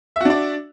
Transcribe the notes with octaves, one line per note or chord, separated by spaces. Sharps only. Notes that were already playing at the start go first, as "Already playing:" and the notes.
D4 F#4 D5 E5